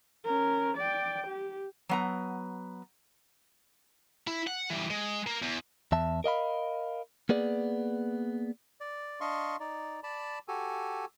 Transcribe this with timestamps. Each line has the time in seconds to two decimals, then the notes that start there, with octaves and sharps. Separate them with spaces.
0.25 C#4 A#4
0.77 D5 G5
1.27 G4
1.89 F#3 B3 A#5
4.27 E4
4.47 F#5
4.70 E3 G3
4.90 G#3
5.27 A#3
5.42 E2
5.92 E2 E5 A5
6.24 A#4 D#5 F5 B5
7.29 A#3 B3 G#4 D5
8.81 D5
9.21 D4 D#5 F5 C6 C#6
9.60 D#4 D5
10.03 D5 A5 B5
10.48 F#4 G4 A4 G#5